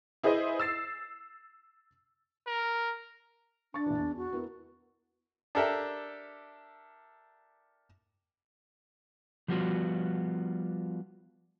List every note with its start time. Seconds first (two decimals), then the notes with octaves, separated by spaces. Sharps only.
0.23 E4 G#4 B4 C5 D#5
0.59 E6 A6 C7
2.47 A#4
3.74 D4 C#6 A6
3.86 A#1 E3
3.98 E2
4.17 F#4
4.33 B3 E4 A#4
5.55 D4 G4 A4 A#4 E5
9.48 F3 G3 B3 F4 F#4